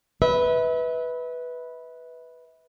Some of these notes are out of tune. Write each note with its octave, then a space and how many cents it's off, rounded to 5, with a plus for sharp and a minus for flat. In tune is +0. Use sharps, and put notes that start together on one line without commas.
B4 +0 E5 -35